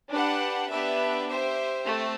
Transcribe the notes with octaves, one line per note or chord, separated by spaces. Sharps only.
D4 G4 B4 F#5
B3 D4 G4 B4 E5
G4 C5 E5
A3 C4